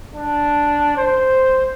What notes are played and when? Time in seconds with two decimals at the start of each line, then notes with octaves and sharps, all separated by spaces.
0.16 D4
0.97 C5